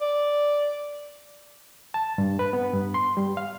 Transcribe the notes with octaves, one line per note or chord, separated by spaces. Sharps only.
D5
A5
G2
B4
B3
G2
C6
G3
F5